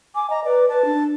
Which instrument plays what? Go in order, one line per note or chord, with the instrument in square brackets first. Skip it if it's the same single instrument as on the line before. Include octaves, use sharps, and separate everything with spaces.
[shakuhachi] G#5 [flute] D6
[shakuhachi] D#5 [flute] A#5
[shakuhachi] B4 [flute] D5
[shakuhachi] B4 [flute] A5
[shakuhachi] D4